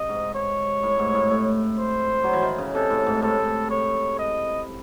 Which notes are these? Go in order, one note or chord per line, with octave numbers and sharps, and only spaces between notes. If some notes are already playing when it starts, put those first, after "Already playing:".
Already playing: C3 D#5
G#2
C#5
A2
G#2
A2
A2
C5
F#3
E3
D#3
C#3
C3 A4
A2
G#2
A2 A4
C#5
D#5